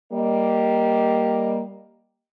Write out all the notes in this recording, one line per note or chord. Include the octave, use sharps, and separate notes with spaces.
G3 A#3 D#5